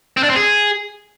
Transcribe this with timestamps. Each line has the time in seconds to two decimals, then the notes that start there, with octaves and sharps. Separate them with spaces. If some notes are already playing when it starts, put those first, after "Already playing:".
0.17 C4
0.23 D4
0.30 C4
0.36 G#4